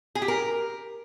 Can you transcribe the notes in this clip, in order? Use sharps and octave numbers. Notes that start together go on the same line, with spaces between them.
G#4
G4
A#4